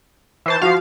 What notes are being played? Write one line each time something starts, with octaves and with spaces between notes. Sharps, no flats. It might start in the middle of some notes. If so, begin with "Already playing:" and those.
E3 C5 A5
F3 F#4 F5